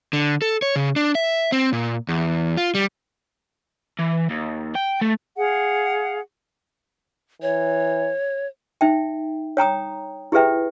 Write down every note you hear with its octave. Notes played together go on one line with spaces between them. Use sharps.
D3
A4
C#5
C#3
D4
E5
C4
A#2
E2
F4
G3
E3
D#2
G5
A3
G#4 F5 F#5
E3 C#5
D#4 E5 G5
C#5 G5 A#5 D#6
E4 G4 G#4 B4 E5 G5